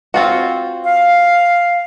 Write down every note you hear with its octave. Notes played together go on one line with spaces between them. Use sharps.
C4 F4 F#4
F5